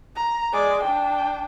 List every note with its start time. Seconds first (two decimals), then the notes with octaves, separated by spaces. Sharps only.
0.16 A#5
0.52 G#3 D5
0.83 D4 G5